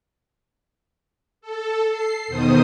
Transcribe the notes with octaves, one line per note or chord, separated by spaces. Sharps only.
A4
C7
E2 B2 D#3 C5 D#6